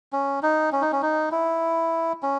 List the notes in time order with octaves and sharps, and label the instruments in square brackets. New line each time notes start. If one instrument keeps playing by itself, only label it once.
[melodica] C#4
D#4
C#4
D#4
C#4
D#4
E4
C#4